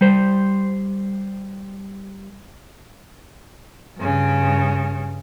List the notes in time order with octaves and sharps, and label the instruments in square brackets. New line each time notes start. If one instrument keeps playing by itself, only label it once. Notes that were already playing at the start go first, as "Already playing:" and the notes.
[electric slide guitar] G3 C5
[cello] G2 C#3